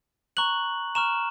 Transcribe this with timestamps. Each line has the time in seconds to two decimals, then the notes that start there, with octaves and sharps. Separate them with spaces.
0.37 A#5 C#6 F#6 F#7
0.95 A#5 C#6 F6 E7